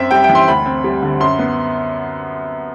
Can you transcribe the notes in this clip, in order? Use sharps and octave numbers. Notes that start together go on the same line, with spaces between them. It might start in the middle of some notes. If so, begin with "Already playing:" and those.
Already playing: F#2 C4 E5
G3 G5
G5
E3
C6
D2 B5
C4
G3
D3
F#2 C6
B3